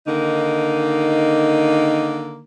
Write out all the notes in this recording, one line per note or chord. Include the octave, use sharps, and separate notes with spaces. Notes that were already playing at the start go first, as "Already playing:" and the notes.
D3 D#3 A#3 D#4